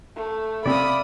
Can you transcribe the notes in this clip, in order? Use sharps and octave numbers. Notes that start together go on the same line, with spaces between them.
A3
C3 C4 D5 E5 F5 B5 D#6